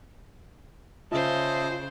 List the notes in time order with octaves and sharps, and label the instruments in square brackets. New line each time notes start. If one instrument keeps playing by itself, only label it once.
[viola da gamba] C#3 C5 [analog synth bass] F4 [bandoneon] D#5 E5 A5